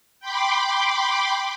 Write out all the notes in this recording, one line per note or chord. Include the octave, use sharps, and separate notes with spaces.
G5 B5 C6 D6